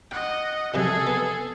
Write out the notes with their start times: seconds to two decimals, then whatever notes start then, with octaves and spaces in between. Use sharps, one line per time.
0.11 D#5 F#5 G5
0.74 C2 C3 F#3 G#4 A4
1.07 B3